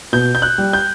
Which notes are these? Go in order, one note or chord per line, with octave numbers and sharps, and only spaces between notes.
B2 G6
G6
F#6
G3
G6